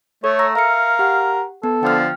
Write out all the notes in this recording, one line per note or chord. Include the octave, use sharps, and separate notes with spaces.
A3 A4 C#5
A#5 E6 A#6
A#4 E5 F5 C#7
G4 F#5
B3 A4
D3 F3 G5 F6